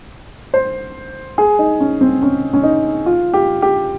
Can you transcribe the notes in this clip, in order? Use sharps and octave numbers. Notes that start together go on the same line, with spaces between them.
C5
G#4
D#4
C#4
C4
C#4
C#4
D#4
F4
G4
G4